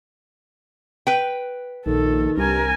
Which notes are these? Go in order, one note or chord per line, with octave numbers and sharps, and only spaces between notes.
B4 G5
A#1 D#3 A4
C2 G2 A#4 G#5